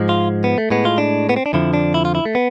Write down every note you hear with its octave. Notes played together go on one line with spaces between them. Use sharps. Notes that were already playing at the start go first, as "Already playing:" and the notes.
Already playing: G#2 F3 G#3
F4
B3
A3
A2 G#3 B3
F4
D4
B3
C4
D4
F2 D3 F3 E4
D4
E4
F4
E4
A3
B3